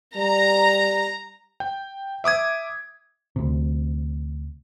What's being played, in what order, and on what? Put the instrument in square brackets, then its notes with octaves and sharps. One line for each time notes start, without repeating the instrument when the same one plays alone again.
[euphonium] G3 [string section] A#5
[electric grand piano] G5
E5 D6 D#6 G#6
[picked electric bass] D2 C3